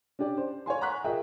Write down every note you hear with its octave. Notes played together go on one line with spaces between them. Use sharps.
C#4 D4 G4 D5
C5
C#5 F5 G#5 C6
F#5 A#5 C6 C#6 F#6 B6
F4 G#4 A#4 D#5 E5 G5